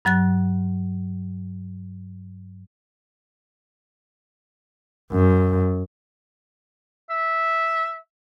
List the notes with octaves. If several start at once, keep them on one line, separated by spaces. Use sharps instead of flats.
G2 F#3 F#6 A6
F#2
E5